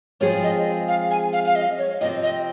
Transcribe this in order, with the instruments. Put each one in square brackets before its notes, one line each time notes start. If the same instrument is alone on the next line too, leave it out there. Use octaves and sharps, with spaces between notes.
[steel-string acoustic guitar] F3 G#3 C4 F4 G#4 [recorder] C#5
[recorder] D#5
F5
G#5
F5
F5
D#5
C#5
[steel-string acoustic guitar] C3 F3 C4 [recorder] D#5
[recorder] D#5